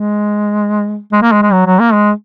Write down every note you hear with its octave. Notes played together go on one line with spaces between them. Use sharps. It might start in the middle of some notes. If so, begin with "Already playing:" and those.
Already playing: G#3
G#3
A#3
G#3
G#3
F#3
F#3
A#3
G#3